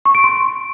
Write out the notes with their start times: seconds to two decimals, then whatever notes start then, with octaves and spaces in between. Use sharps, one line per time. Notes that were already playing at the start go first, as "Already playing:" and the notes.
0.05 C#6
0.15 D7
0.24 C6